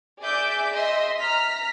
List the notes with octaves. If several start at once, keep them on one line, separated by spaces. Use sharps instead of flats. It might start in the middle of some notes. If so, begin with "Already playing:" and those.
G#4 D5 E5 D6 G6
D#5 E5 C6
A#5 F6 B6